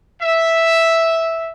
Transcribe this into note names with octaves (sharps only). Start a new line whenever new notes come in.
E5